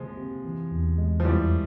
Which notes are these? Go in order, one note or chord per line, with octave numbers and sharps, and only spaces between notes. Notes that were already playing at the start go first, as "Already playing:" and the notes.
Already playing: C3 F3 G#3 A#3
C3
E3
E2
G#3
F3
F2 E3 G3